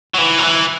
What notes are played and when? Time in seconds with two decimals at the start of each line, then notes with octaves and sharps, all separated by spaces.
0.14 F#3
0.18 E3
0.39 F#3
0.44 E3